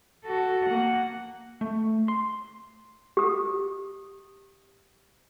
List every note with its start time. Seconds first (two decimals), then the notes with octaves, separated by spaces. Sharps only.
0.25 F#4 A4
0.66 A#3 F#5
1.61 A3
2.08 C6
3.17 G4 D#6